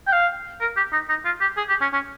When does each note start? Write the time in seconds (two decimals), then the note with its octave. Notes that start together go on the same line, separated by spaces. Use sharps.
0.07 G5
0.12 F5
0.61 A#4
0.77 G4
0.93 D#4
1.09 D#4
1.25 F4
1.41 G4
1.57 G#4
1.69 G4
1.81 C#4
1.93 C#4